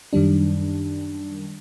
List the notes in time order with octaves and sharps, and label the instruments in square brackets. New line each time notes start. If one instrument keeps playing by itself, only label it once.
[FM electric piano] F#2 D#3 G3 D4